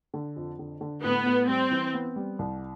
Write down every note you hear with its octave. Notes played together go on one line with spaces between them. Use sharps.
D3
F2
D3
D3
A2 B3
A2
G3 C4
E3
B3
G3
C2